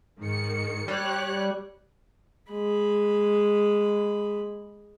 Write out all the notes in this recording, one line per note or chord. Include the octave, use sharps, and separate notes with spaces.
G#2 D#3 C#7
G3 G4 C#5 F#6
G#3 B5